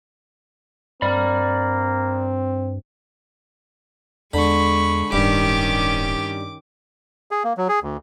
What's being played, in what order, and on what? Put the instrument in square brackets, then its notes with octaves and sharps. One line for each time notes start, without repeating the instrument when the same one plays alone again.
[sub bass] G2 [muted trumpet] A#3 [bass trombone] C4 [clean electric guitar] D5 B5
[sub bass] E2 [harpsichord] D3 [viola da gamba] G#3 [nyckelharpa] B5 C#6
[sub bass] D1 [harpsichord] G2 [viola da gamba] D#3 C#4 G4 [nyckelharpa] D6
[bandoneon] G#4
A#3
F#3
G#4
D2